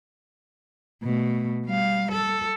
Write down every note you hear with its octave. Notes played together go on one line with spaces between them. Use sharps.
B2 A3
G3 F5
A4